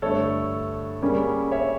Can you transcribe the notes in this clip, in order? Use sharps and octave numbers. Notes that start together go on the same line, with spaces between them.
G2 D3 A3 A4 C#5
C#3 G3 A#3 C#4
C#5 E5